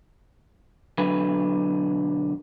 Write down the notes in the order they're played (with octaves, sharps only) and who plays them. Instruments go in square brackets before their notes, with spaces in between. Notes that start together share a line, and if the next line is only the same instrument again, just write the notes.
[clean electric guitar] B1 D3 F#3 B4